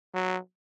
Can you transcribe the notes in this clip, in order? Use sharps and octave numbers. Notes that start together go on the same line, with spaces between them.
F#3